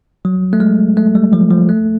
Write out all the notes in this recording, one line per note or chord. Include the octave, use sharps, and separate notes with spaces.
F#3
A3
G#3
A3
G3
F3
F3
A3